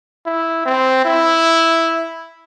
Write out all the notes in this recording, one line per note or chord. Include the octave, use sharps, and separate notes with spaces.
E4
C4
E4